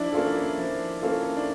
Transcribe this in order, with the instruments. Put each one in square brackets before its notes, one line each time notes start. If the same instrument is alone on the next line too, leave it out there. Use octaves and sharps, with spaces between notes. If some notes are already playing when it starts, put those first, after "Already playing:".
Already playing: [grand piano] F3 [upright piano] D4 E4
[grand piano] A#3 C#4 F4 A4
F3
A#3 C#4 F4 A4
[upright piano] D4